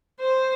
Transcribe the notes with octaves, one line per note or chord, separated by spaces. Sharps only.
C5